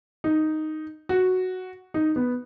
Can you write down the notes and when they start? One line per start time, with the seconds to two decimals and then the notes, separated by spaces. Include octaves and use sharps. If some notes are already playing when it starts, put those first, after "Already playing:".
0.24 D#4
1.09 F#4
1.94 D#4
2.16 B3